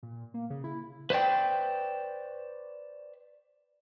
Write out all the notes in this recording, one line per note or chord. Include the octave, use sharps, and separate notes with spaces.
A#2
A#3
C#3
E4
B4 C5 D5 G5